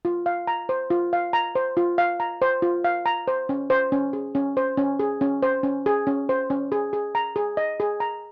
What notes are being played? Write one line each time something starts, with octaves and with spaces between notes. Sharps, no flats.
F4
F5
A#5
C5
F4
F5
A#5
C5
F4
F5
A#5
C5
F4
F5
A#5
C5
C#4
C5
C#4
G#4
C#4
C5
C#4
G#4
C#4
C5
C#4
G#4
C#4
C5
C#4
G#4
G#4
A#5
G#4
D#5
G#4
A#5